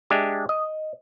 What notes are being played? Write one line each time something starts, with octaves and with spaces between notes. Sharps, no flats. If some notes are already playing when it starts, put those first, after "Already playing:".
G#3 D4 G4 E5
D#5